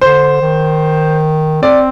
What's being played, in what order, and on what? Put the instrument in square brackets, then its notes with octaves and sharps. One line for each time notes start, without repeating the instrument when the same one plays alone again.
[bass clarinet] D3 [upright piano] C5
[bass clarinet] D#3
[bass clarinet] C4 [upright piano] D5